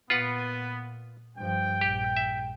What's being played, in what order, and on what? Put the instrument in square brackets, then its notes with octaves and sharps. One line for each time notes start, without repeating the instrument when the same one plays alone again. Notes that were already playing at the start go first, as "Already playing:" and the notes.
[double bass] A#2 [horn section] B3 [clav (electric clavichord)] F4 B4 F#5
[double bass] G2 F3 [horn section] G5
[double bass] A#1 [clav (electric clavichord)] G4
[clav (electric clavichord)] E5